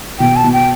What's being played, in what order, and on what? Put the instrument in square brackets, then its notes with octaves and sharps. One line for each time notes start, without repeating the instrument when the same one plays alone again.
[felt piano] B2 [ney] G5
[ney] A5
[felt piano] B2
[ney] G5